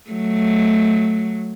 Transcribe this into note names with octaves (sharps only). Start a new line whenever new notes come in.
F#3 A3